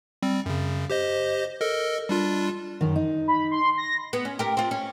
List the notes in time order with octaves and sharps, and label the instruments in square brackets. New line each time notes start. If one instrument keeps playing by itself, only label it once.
[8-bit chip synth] G3 C4
F#2 C#3
G4 C5 D#5
A4 A#4 D#5
G3 D4 F4
[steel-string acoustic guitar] F#2 D#3
D#4
[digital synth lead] B5
C6
A#6
[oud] B3
C#4
G4 A#4
C4 F4
C#4